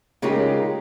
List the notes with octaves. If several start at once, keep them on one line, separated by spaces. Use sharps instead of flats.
C#3 G#3 D#4 F4 G4 A#4